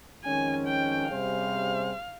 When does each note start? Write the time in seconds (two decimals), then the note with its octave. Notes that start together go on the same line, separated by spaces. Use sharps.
0.25 F2 D#3 G#3 C#4 G#5
0.67 G5
1.10 C3 G3 C#4 G#4 C5 F5